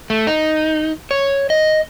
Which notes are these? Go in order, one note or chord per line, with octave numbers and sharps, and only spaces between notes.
A3
D#4
C#5
D#5